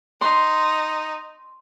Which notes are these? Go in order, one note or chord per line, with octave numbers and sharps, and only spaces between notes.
D#4 C6